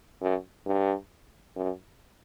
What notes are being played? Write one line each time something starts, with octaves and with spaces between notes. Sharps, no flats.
F#2
G2
F#2